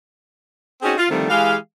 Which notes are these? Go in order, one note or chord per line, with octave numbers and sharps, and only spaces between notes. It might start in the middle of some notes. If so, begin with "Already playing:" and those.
C4 C#4 D#4 F#4 G#4
F4
D3 D#3 F3 G3 A3 C4
E3 G#3 G4 G#4 F5